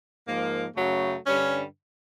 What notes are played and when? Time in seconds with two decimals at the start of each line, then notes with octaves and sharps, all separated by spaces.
0.27 G#2 F3 A#3
0.75 F#2 C#3 F#3 A3
1.26 G2 D3 G3 C#4